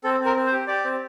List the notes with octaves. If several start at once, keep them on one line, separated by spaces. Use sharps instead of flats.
C4 A4
C4
A#4
C4
C5
G4
G4 D5
C4